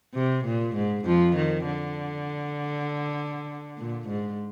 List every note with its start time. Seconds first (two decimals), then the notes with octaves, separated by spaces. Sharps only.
0.15 C3
0.45 A#2
0.76 G#2
1.06 F2 F3
1.36 D#3
1.66 D3
3.78 A#2
4.08 G#2